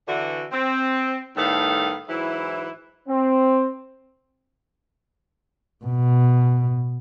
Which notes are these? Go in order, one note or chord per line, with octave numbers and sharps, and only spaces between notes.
D3 E3 F#4
C4
A2 D#3 G3 B3 A4 F5
G#2 E3 F#3 E4
C4
B2